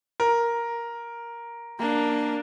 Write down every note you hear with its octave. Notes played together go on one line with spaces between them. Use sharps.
A#4
A#3 D4